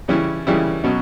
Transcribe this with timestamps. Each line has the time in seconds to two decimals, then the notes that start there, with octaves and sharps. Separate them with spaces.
0.08 C#3 E3 G3 C#4 E4
0.47 C#3 E3 G3 C#4 E4
0.84 B2 F#3 C#4